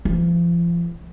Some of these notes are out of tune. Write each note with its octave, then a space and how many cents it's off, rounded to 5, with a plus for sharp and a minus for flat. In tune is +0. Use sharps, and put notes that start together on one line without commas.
F3 -35